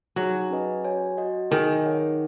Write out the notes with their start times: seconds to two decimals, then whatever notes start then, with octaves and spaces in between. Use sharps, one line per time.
0.16 F#3 D#4 G#4 C#5 G#5
0.50 C#4 G#4 B4 D#5 G#5
0.84 F#4 C#5 G#5
1.17 F#4 D#5 F#5
1.51 D#3 D#4 G#4 D#5 G#5
1.85 G#4 C#5 F#5